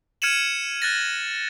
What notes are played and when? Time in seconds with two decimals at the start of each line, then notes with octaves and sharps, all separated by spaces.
0.22 F6 G#6 C#7 D#7 E7 F#7
0.82 F#6 A6 A#6